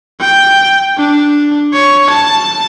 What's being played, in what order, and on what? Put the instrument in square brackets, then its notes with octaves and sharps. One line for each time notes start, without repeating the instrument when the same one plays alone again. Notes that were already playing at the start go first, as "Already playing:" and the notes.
[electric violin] G5
D4
C#5
A5